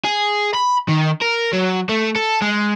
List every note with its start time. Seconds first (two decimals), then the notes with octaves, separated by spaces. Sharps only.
0.04 G#4
0.54 B5
0.88 D#3
1.21 A#4
1.53 F#3
1.89 A3
2.16 A4
2.42 G#3